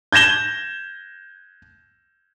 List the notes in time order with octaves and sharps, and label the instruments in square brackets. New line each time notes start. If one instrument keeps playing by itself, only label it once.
[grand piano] G6 G#6 A#6 E7 G7